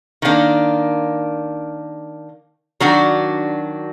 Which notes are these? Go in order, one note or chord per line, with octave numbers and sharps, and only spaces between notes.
D#3 A#3 D4
D#3 F#3 D4 F#4